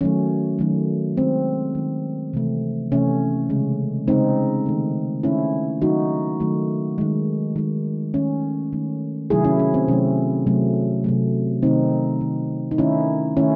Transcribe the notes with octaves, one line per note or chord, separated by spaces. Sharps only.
D#3 F#3 A3 C#4
D#3 F#3 A3
D#3 G#3 C4
D#3 G#3
C3 E3 A3
C3 E3 A3 C#4
C#3 G#3
C#3 G#3 C4 D#4
D#3 A3
D#3 A3 C#4 E4
D#3 F#3 A3 D#4 F#4
D#3 F#3 A3
D#3 G#3
D#3 G#3
D#3 A3 C#4
D#3 A3
C3 D#3 F#3 A3 E4 G#4
C#4 E4
C#4
C4
C3 D#3 F#3 A3 C#4
C3 F#3 A3
C3 F#3 A3
C3 D#3 A3 C4 D#4
C3 D#3 A3
D#4
D#3 A3 C#4 E4
D#3 A3 C#4 E4